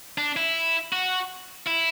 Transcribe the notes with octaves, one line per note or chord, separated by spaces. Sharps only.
D4
E4
F#4
E4